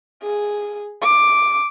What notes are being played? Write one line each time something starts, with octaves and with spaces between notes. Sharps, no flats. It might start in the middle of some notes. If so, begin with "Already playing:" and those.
G#4
D6